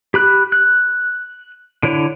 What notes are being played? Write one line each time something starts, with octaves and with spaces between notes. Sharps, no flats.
G4 B5 F#6
F#6
D3 E4 C#5